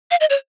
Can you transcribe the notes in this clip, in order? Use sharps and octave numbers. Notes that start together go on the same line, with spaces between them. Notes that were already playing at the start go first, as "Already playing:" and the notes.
F5
D#5
C#5